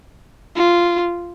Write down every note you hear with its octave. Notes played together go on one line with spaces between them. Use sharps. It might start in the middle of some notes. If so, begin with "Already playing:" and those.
F4